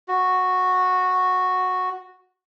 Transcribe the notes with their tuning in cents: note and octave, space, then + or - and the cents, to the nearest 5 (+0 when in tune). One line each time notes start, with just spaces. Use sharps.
F#4 -5